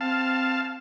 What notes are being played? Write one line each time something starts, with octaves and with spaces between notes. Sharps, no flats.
C4 F5 A5